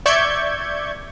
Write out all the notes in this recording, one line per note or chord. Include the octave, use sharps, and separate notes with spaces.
D5 E5 C#6 G6 G#6